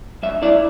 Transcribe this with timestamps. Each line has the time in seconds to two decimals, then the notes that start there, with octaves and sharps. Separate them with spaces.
0.23 G2 E5
0.42 E4 D5